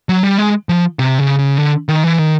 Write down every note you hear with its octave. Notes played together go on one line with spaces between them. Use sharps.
F#3
G3
G#3
F3
C3
C#3
C#3
D3
D#3
E3
D#3